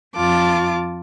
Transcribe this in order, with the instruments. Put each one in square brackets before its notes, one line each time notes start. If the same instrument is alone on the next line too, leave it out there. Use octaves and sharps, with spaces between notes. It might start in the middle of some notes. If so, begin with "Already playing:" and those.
[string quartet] F2 F4 A5 D6